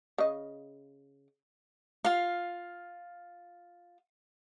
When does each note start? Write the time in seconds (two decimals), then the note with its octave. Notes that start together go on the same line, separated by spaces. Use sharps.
0.18 C#3 D#5
2.05 F4 F5